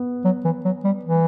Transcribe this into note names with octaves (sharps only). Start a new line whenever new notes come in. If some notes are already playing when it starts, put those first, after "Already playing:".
Already playing: B3
F#3
E3
F#3
G3
E3